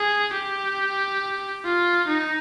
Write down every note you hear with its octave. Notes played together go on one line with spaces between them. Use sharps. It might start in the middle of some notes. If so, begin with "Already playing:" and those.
Already playing: G#4
G4
F4
D#4